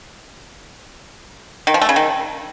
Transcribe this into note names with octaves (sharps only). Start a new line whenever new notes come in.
D#3
F3
A3
C#3
D#3